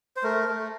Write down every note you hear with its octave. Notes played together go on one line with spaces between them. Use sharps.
C5
A3 A#4
A3